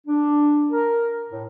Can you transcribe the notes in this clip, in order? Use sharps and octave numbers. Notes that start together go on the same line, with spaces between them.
D4
A#4
A2